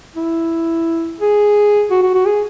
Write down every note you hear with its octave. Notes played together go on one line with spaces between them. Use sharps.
E4
G#4
F#4
F#4
F#4
G#4